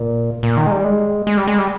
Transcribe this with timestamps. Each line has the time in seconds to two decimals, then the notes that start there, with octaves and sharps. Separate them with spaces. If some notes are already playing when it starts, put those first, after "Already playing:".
Already playing: A#2
0.43 A#2
0.57 D#3
0.67 G#3
0.71 G3
0.84 G#3
1.27 G#3
1.37 G3
1.48 G#3
1.58 G3